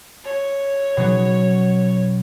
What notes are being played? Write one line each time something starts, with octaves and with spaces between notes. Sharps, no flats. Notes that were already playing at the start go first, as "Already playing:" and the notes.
C#5
B2 F#3 C#4